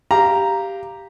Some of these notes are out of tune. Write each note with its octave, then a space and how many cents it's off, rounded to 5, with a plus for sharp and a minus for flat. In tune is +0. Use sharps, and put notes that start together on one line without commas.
G4 +0 F5 -10 A#5 +0